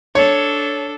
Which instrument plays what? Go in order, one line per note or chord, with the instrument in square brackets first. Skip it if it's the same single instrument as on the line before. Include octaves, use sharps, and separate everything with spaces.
[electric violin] D4 A4 [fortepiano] C#5